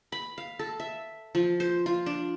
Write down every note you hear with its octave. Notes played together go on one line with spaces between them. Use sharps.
B5
F5
A4
E5
F3
C5
F4
D4